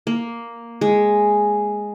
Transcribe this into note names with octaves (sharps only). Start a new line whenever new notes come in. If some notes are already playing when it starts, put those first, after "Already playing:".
A#3
G#3